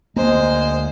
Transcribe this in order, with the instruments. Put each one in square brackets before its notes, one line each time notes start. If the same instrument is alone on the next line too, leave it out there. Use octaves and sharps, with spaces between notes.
[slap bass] D2 A#3 [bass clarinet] G#3 [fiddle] C5